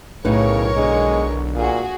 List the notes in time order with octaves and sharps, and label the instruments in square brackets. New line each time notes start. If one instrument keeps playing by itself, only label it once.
[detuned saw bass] B1 [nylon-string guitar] A2 D#4 B4 [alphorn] C#3 [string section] A#4 C#5 C#6
[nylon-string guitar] D3 [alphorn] G#3
[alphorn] A#2 [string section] F#4 G#4